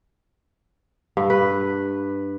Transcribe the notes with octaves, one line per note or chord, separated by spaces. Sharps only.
G2
B4